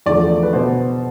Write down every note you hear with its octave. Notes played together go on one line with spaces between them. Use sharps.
E2 D3 F3 A3 D5
B4
B2 B3 C5